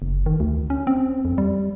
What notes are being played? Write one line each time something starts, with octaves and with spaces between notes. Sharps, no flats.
F#1
D#3
D2
C#4
C4
F2
G3